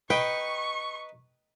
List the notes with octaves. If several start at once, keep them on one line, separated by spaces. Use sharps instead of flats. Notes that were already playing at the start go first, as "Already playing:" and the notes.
D#4 B4 G5 C#6